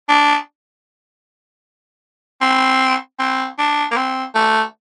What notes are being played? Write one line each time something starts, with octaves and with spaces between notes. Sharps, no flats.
D4
C4
C4
D4
A#3
C4
A3